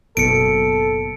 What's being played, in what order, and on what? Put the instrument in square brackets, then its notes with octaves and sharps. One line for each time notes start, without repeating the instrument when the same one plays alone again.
[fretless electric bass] F#1 B2 [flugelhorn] A4 [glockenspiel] C#7 D7